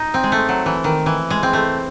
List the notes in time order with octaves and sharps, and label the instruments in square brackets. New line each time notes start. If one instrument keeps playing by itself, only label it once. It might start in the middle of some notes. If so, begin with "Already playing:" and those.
Already playing: [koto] D#4
C4
G#3
A3
F#3
E3
D#3
E3
G#3
C4
A3